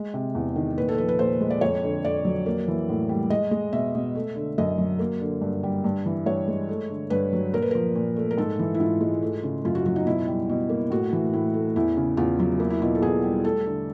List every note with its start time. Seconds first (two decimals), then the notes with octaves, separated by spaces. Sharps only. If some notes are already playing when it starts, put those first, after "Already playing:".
Already playing: G#3
0.14 C3
0.35 E2
0.56 D#3
0.78 A#2 B4
0.88 A4
0.98 F3 B4
1.08 B4
1.19 A#2 C5
1.41 G#3
1.50 D5
1.61 F2 C#5
1.83 D3
2.05 F2 D5
2.25 F#3
2.46 A#3
2.68 E3
2.89 A2
3.09 G3
3.30 G#3 D#5
3.51 G#3
3.73 B2 E5
3.95 B2
4.15 A3
4.36 D3
4.58 F#2 D#5
4.78 F#3
4.99 A#3
5.21 D3
5.42 G2
5.63 G3
5.84 G2
6.06 E3
6.26 G2 C#5
6.48 G#3
6.69 A3
6.90 D3
7.10 G2 B4
7.33 F#3
7.53 A#2 A#4
7.62 B4
7.71 F3 A#4
7.96 A#2
8.16 A3
8.31 A#4
8.38 G#2 A4
8.59 E3
8.74 E4
8.80 G#2 F4
9.01 G#3
9.22 A3
9.43 C#3
9.64 F#2 F4
9.75 F#4
9.86 F#3 F#4
9.96 D#4
10.06 B2 E4
10.28 G3
10.49 B2
10.69 A#3
10.90 A2 F#4
11.13 E3
11.33 A2 E4
11.54 A3
11.76 E2 E4
11.97 C#3
12.17 E2 F4
12.40 F#3 F4
12.59 A#3 E4
12.70 E4
12.82 B2 F4
12.95 A4
13.02 E2 G#4
13.24 G3
13.44 A3 A4
13.66 D3